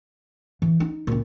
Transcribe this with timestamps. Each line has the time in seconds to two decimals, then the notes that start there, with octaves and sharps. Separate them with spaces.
0.62 E3
0.80 D#4
1.07 C#2 A#2